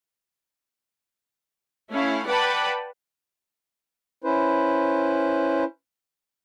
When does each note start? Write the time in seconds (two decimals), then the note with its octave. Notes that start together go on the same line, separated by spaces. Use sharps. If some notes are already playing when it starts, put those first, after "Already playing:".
1.91 A3 C#4 E4 F5
2.27 B4 D5 F#5 G5 A5 B5
4.24 C#4 E4 B4 C5